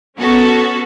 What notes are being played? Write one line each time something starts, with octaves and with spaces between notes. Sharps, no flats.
B3 C#4 F#4 A4